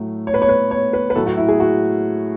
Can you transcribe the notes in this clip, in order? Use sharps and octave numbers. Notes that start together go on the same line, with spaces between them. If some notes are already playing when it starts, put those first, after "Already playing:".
Already playing: A2 F#3 A3
C#5
B4
C#5
B4
C#5
B4
B4
A2 F#3 A3 A4
F#4
E4
G#4
F#4